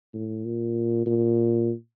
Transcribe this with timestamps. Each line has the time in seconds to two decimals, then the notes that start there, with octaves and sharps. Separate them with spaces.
0.14 A2
0.45 A#2
1.06 A#2